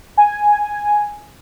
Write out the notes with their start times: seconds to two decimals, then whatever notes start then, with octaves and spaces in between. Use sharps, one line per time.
0.17 G#5